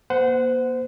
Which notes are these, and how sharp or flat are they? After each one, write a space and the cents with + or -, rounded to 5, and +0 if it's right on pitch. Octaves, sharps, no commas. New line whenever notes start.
A#3 +40 C5 -30 F#5 +0